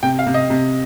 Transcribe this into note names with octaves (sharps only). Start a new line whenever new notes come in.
C3 G5
F5
C3
D#5
C3